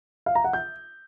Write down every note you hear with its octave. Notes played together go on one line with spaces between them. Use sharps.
F5
A#5
F#5
G6